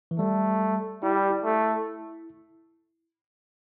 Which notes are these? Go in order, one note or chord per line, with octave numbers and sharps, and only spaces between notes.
E3
G3 A3
G3 E4
G4
E4
A3